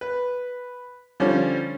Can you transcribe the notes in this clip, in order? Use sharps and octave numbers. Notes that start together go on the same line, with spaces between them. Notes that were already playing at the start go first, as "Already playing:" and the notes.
B4
D3 F3 G3 C#4